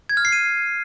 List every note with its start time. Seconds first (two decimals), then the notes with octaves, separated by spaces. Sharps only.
0.09 G#6
0.17 F6
0.25 C7
0.32 D#7